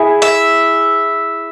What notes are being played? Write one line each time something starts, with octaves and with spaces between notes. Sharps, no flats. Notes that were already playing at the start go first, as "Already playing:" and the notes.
Already playing: E4 G#4
E5